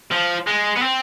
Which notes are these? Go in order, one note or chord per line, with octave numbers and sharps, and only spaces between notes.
F3
G#3
B3
C4